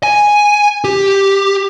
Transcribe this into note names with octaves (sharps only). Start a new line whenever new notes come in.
G#5
G4